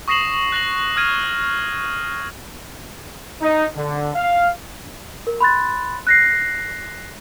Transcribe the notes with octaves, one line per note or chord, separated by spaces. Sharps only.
C#6 D#6 A#6 C7 E7 F#7
F#6 A#6 F#7
D#6 F6 G#6 D#7
D#4
D3
F5
A#4
B5 C6 F#6 A6
F#6 A#6 C7